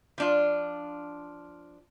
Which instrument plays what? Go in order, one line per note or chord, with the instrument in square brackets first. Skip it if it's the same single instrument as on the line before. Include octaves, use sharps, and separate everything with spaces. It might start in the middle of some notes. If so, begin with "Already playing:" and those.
[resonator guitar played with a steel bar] F3 D4 F4